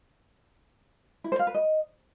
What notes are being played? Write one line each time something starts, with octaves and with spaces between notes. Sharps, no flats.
E4
C5
F5
B4
D#5